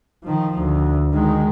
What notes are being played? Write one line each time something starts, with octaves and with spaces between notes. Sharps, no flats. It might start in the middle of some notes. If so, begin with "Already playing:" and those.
D#3 F3
D2
D#3 G#3